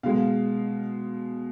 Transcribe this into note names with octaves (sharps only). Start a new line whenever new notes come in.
B2 G#3 F5